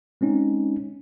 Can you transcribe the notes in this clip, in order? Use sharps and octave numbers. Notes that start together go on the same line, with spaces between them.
G#3 C4 C#4 D#4